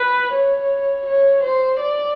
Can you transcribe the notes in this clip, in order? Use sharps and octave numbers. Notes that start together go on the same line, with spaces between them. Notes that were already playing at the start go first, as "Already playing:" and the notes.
Already playing: B4
C#5
C#5
C5
D5